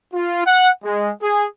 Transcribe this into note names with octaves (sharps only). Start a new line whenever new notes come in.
F4
F#5
G#3
G#4